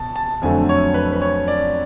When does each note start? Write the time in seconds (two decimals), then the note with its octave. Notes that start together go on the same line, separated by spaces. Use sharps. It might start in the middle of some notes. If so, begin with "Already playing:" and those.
Already playing: B2 A5
0.16 A5
0.42 F2 D3 F#3 A3 G#5
0.69 C#5
0.94 B4
1.12 B4
1.21 C#5
1.48 D5